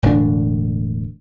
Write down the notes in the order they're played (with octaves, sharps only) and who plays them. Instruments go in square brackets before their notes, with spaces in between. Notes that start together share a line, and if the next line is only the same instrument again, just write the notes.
[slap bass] E1 A2 D3 D4